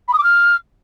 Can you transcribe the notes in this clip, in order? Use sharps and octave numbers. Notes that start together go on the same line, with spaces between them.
B5
D#6
D6
F6